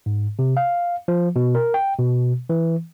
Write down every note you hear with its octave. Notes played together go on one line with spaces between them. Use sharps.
G#2
C3
F5
F3
B2
A#4
G5
B2
E3